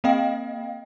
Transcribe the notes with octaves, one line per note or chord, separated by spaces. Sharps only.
A#3 C4 D#5 F5 G5